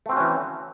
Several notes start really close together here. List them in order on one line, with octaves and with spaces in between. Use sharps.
A3 C4 F#4 C#4 E3